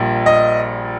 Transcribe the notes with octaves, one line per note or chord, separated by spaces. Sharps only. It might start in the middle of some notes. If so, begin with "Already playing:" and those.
Already playing: A#1 A#2 G3
D#5